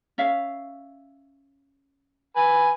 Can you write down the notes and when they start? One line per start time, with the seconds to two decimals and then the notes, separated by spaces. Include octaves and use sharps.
0.18 C#4 E5 F5
2.36 B4 G#5